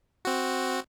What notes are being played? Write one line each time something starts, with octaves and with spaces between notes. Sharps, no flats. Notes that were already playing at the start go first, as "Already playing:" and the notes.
C4 F#4